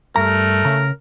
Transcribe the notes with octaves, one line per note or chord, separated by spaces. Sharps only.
G2 A3 A#4 A#5
C#3 A#5